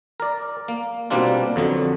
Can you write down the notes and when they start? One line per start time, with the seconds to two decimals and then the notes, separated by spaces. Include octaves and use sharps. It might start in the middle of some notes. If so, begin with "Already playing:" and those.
0.20 A#4 D5
0.68 A#3
1.10 B2 G3 A#3 C4 D4 F4
1.56 F2 D3 F#3